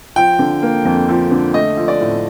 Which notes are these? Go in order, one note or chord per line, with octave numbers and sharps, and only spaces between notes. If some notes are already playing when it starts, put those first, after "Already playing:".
F3 G5
D3
A#3
F2
F3
D3
A3 D#5
F3
D5
A2